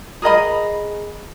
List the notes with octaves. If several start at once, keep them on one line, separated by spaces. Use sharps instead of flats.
G#4 A#4 D#5 B5